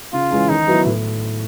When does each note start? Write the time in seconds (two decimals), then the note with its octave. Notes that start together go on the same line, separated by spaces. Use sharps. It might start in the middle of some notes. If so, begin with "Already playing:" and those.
0.13 C#3 F4
0.31 E3 G#3 C#4
0.49 D#3 D#4
0.67 F#3 B3 E4
0.86 A2